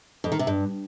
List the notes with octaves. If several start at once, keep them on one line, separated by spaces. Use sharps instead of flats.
F2
D#3
C3
G2